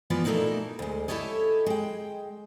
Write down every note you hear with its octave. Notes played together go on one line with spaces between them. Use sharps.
E3 F3 B3 F4 B4 D5
A#2 A3 A#3 D#4 E4 F#4
D2 G#3
E4 G4 A4 C#5 D#5
G#3 G5